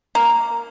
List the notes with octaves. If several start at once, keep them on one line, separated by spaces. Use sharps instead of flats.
A#3